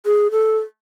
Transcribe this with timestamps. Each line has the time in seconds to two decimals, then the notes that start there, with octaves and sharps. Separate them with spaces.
0.06 G#4
0.31 A4